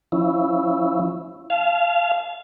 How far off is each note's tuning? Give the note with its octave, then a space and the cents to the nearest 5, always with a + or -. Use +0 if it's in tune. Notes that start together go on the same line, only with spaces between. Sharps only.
F3 +0 C#4 +0 E4 +0
F5 -20 A5 -35